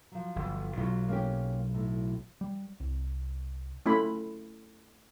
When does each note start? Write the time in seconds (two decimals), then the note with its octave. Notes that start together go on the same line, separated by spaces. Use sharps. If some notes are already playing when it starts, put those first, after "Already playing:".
0.12 F3 F#3
0.36 G1
0.78 B1 F#3 F4
1.09 A#3 C#4 G4
1.74 A2
2.41 G3
2.80 C2
3.86 A3 C#4 E4 F4 B5